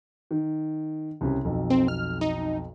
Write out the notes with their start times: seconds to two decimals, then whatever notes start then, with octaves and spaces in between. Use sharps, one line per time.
0.31 D#3
1.21 C2 C#3 G4
1.45 B1 F2 B2
1.70 C4
1.88 F6
2.21 D#4